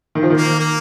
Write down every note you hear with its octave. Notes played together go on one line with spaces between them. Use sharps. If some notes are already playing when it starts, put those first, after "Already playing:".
D#3
F3
D#3
A#3
A#3